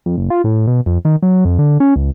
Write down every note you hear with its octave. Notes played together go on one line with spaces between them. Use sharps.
F2
F#1
F4
A2
B2
F2
D#3
F#3
F2
D3
C#4
C#2